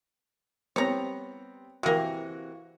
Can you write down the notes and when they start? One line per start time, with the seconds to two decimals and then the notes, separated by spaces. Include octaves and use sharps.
0.76 G3 B3 C4 C#5 A#5
1.83 C3 E3 A#3 F#4